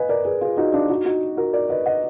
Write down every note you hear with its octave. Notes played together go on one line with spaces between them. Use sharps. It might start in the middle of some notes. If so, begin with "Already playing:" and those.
Already playing: B4 D#5 F5 G#5
A#4 D5
G#4 B4
F4 G#4
D#4 F#4
D4 F4
D#4 F#4
D#4 F#4
F#4 A#4
A#4 D5
B4 D#5
D#5 F#5